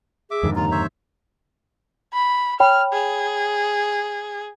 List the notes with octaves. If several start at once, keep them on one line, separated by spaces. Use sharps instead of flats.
G#4 E5 D6
F2 G#2 D3 D#3
D#2 F4 A#5
C5 C#5 E5
B5
C#5 G5 B5 F6
G#4